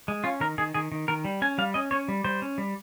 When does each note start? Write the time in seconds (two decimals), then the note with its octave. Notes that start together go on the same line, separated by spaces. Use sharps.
0.08 G#3
0.24 C#4 F4
0.40 D#3 A#4
0.58 D#3 G#4
0.74 D#3 G#4
0.92 D#3
1.08 D#3 A#4
1.25 G3
1.42 C#4 G#5
1.58 G3 F5
1.74 C#4 D#5
1.91 C#4 C#5
2.08 G3
2.24 G3 C5
2.42 C#4
2.58 G3